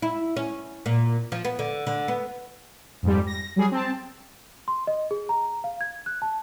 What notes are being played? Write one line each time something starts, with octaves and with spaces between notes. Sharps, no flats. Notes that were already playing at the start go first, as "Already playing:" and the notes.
E4
C#4
A#2
F3
B3
D3
D3
B3
F2 G#2 G3
A#6
F#3 G3 G#4
C4 A5
C6
D#5
G#4
A#5
F5
G#6
F#6
A5